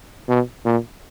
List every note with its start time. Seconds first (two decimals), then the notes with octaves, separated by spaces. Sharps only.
0.29 B2
0.66 A#2